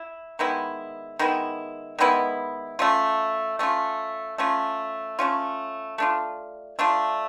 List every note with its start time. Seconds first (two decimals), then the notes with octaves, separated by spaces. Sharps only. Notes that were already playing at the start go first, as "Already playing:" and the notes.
Already playing: E4
0.39 D#3 G#3 B3 E4
1.19 D#3 G#3 B3 E4
1.99 D#3 G#3 B3 E4
2.79 A3 C#4 F4
3.59 A3 C#4 F4
4.38 A3 C#4 F4
5.19 A3 C#4 F4
5.98 A3 D4 F4
6.79 A3 D4 F4